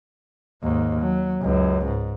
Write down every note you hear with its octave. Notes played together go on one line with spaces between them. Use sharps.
D#2 G#2
F#3
C#2 F#2
G#2